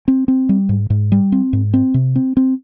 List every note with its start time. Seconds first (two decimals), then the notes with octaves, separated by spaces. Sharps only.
0.08 C4
0.28 C4
0.49 G3
0.69 G#2
0.90 G#2
1.12 G3
1.32 C4
1.53 G#2
1.74 C4
1.94 C3
2.16 C4
2.37 C4